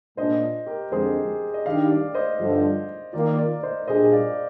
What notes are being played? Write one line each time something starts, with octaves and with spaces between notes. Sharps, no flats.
A#2 G#3 D4 C5 D#5
G4 A#4
F2 D3 G#3 G#4 C5
D#5
D#3 G3 D4 G4 D5 F5
D5 F5
C5 D#5
G2 D3 F3
D#3 A#3 F4 A#4 D5
A#4 D5
C5 D#5
A#2 G3 D4 G#4 C5 D#5
D5 F5